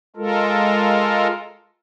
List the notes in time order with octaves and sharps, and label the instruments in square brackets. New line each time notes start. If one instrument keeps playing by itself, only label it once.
[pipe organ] G#3 F4 A4 A#4